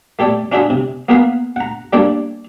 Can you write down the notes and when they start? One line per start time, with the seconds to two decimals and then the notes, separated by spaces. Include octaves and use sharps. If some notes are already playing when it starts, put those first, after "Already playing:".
0.19 A3 G4 A4 C#5 D5
0.52 C#4 D4 F4 F#4 G#4 E5
0.70 C3
1.09 A#3 B3 G#4 A#4 B4 F5
1.56 F#5 A#5
1.93 G3 A#3 D4 A4 C#5 D5